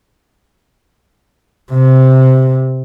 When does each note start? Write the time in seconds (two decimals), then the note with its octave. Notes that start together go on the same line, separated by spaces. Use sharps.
1.72 C3